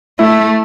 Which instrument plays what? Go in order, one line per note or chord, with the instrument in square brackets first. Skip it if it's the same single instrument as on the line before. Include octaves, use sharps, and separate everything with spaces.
[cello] A3 [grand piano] E4